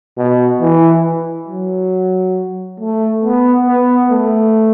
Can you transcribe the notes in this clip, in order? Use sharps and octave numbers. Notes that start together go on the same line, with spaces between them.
B2
E3
F#3
A3
B3
B3
A3